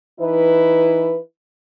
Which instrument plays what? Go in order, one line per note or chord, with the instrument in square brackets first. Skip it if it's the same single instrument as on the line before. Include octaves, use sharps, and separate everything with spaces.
[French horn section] E3 D#4 E4 B4